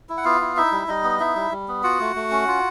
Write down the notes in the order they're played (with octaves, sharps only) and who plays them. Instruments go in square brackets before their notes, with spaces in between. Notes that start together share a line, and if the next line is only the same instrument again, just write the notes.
[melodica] E4
F#5
B3 F4 F5
E4
D#4 E4 E5
G3
G3 D#4 D#5
B3
D#4 E4 E5
G3
G3
B3
F4 F#4 F#5
A3
A3
C#4
F4